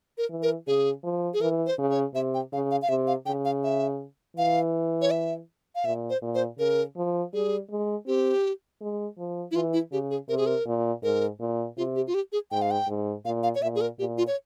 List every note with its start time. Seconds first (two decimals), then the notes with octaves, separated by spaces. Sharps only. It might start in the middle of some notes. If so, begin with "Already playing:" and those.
0.18 A#4
0.30 E3
0.42 A#4
0.67 C#3 G#4
1.04 F3
1.34 G#4
1.41 E3 A#4
1.66 C5
1.78 C#3
1.91 C#5
2.15 C3 E5
2.34 G5
2.53 C#3 F5
2.71 F5
2.82 F5
2.89 C3 E5
3.07 F5
3.26 C#3 G5
3.45 F5
3.64 E5
4.37 E3 F5
5.01 C#5
5.11 E5
5.75 F5
5.85 A#2 E5
6.10 C5
6.22 A#2
6.35 C5
6.59 C#3 A#4
6.97 F3
7.34 G3 G#4
7.70 G#3
8.07 C4 G4
8.81 G#3
9.18 F3
9.51 E4
9.54 E3 F4
9.73 E4
9.92 C#3 G4
10.11 G#4
10.29 C3 A#4
10.37 G#4
10.46 A#4
10.66 A#2
11.03 G#2 A#4
11.40 A#2
11.77 C3 F4
11.96 G4
12.07 F4
12.14 G4
12.32 G#4
12.51 G#2 G5
12.62 F5
12.71 G5
12.88 G#2
13.25 A#2 F5
13.43 F5
13.55 C#5
13.62 A#2 E5
13.75 G#4
13.81 A#4
13.99 A#2 G4
14.18 F4
14.27 C#5